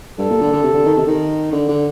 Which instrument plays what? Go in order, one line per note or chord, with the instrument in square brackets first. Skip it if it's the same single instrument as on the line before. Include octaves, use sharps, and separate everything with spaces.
[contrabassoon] G2 [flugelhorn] A4
[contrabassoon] A#2
D3
D3
C3
D3
D#3
C3
D#3
D3
D3